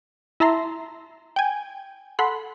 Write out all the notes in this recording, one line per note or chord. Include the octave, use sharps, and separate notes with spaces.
E4 E5 A5 A#5 C6
G5 G#5
A4 F#5 B5 C6